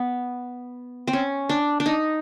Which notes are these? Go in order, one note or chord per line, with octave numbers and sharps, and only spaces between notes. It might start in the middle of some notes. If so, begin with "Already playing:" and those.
Already playing: B3
C4
C#4
D4
D4
D#4